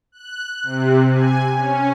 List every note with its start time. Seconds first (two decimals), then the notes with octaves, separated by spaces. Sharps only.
0.12 F#6
0.63 C3
1.11 G#5
1.55 C#4